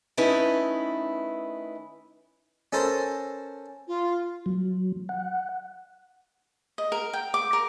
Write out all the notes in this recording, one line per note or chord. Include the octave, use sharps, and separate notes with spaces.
D#3 A3 C#4 D#4 E4 B4
C#4 A4 A#4 C5
F4
F#3
F#5
D#5
A#4
G5
D6
A#4